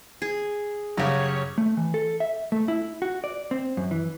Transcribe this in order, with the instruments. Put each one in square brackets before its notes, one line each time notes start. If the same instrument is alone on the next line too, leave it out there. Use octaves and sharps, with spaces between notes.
[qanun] G#4
[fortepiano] F#2 C#3 [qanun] F#4 G4 [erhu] C#5
[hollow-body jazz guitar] A3
E3
A4
E5
A3
E4
F#4
D5
C4
F#2
E3